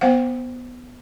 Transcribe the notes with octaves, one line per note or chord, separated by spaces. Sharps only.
B3 C5 F5 F#5